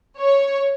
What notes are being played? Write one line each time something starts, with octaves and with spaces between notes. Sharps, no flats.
C#5